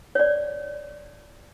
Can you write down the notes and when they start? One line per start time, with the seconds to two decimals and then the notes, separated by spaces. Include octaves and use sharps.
0.15 C#5 D5